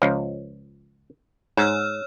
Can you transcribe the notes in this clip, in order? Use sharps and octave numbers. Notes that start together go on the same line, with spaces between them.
C#2 F3
G#2 C#5 E6 F6